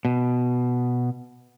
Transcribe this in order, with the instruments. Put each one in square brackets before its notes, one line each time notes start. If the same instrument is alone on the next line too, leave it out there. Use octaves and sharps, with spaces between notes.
[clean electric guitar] B2